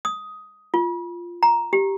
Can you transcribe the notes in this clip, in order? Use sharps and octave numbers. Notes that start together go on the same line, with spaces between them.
D#6
F4
A#5
G4